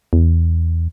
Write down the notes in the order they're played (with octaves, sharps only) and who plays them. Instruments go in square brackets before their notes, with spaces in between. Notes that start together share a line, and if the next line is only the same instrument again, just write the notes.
[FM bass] E2